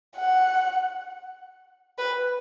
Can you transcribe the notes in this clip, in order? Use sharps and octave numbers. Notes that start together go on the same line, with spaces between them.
F#5
B4